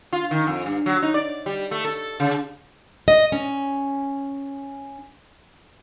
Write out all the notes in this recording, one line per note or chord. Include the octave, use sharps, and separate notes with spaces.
F4
D#3
F2
G2
F#3
D#4
D5
G3
A3
A4
C#3
D#5
C#4